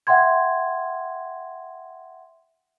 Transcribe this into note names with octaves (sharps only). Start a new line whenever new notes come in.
E5 F#5 G5 C6 G#6